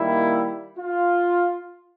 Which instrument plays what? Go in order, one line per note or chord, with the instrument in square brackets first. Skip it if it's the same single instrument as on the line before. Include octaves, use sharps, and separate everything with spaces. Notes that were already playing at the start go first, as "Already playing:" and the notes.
Already playing: [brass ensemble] D#3 G3 A#3 E4
F4